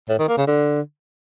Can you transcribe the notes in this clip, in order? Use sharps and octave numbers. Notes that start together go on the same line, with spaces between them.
A2
D#3
A#3
C#3
D3